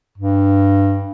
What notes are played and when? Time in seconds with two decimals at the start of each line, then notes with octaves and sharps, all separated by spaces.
0.18 G2